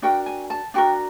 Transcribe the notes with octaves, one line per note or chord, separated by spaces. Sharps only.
D4 F#4 A#4 G5
G#5
A5
D4 F#4 A#4 G5